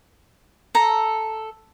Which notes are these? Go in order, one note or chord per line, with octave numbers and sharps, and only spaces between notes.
A4 A#5